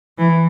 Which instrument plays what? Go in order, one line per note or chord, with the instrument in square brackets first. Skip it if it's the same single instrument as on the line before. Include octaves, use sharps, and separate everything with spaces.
[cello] E3